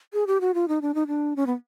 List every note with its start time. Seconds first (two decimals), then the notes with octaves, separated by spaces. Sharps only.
0.13 G#4
0.27 G4
0.41 F#4
0.54 F4
0.68 D#4
0.82 D4
0.95 D#4
1.07 D4
1.36 C#4
1.47 B3